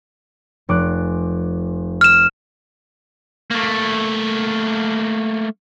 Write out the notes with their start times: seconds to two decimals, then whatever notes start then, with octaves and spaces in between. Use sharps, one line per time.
0.69 F1 D6 F#6
2.01 F6 E7
3.51 A3 A#3